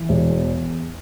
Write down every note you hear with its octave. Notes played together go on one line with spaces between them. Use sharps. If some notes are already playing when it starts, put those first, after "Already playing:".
Already playing: E3
E1
E2